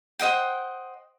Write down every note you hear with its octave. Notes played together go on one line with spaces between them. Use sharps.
C5 D#5 F#5 G5